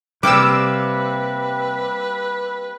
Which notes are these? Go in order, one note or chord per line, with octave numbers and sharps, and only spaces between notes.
C3 G3 A#3 C4 B4 D6 E6